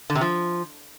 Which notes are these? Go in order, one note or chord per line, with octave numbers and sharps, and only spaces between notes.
D3
C3
F3